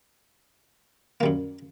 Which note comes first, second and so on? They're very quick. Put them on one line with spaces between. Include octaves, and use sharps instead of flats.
A#3 G3 F#2